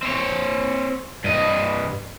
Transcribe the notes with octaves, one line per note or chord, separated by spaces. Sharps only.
C4 C#5
G2 D#5